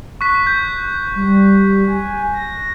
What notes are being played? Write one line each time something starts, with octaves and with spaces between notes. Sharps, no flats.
C#6 F#6 B6
G6
G3
G#5
A#6